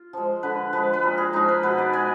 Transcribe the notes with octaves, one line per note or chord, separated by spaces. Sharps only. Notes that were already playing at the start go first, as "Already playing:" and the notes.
Already playing: F4
F3 G#3
D3 B4
F3 G#3 B4
B4
A#2 A#4
G#4
F3 G#3 D#4
B4
B2 B4
D5
G#3 G#5